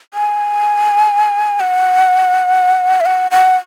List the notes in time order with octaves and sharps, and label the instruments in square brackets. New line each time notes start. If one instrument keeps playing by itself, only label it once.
[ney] G#5
F#5
E5
F#5
F#5